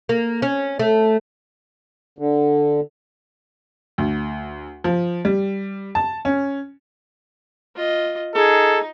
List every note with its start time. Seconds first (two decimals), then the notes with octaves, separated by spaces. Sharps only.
0.09 A#3
0.42 C#4
0.79 A3
2.19 D3
3.98 D2
4.84 F3
5.25 G3
5.95 A5
6.25 C#4
7.76 F4 D#5
8.35 D#4 G#4 A4